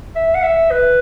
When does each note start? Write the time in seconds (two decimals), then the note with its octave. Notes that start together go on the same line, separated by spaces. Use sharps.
0.15 E5
0.35 F#5
0.43 E5
0.71 B4